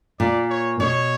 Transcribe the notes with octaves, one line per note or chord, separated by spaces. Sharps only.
A#2 D5
C#5
B2 C#5